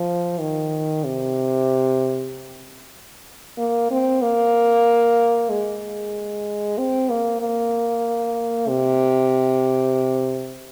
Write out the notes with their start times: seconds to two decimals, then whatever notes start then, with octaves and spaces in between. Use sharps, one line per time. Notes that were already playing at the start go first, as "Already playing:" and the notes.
Already playing: F3
0.40 D#3
1.04 C3
3.58 A#3
3.90 C4
4.22 A#3
5.49 G#3
6.78 C4
7.10 A#3
7.40 A#3
8.68 C3